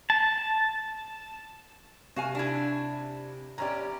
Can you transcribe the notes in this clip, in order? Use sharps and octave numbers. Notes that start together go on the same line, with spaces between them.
A5
C3 F#4 F5 G#5
D4 E4
E2 C#4 G4 D5 A#5